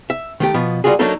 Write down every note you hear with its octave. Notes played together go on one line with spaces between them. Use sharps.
E5
D#3 A3 G4
B2 F3 B3
G3 A3 A#3 F4 F#4 G#4
F#3 A3 A#3 D4 D#4 A4